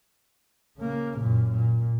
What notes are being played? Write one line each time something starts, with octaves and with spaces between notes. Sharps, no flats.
C#3 A#3
F#2 A#2
A#2